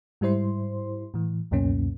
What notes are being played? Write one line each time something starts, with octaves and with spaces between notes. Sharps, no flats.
G#2 G3 E4 C5 C6
A2 E3
C#2 F#2 B2 A#3 C#4